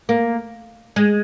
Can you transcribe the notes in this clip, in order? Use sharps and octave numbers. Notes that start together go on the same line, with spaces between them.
A#3
G#3